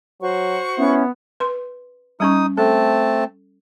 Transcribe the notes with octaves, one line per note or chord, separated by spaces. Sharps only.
F#3 F#4 C5 C#6
B3 C#4 E4
B4 C6
G3 C#4 D#4 C#6 D#6
A3 C4 A4 A5